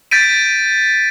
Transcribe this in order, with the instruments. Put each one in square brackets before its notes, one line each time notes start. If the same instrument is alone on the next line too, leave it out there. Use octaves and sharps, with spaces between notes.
[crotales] G6 A6 B6 D7 D#7